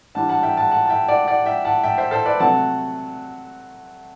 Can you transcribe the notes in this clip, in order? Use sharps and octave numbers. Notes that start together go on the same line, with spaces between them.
E3 G3 D4 F#5 A5
F#5 A5
E5 G5
F#5 A5
F#5 A5
A5
E5 G5
D5 F#5
D5 F#5
E5 G5
F#5 A5
E5 G5
C5 E5
A4 C5
B4 D5
C3 F#3 A3 F#5 A5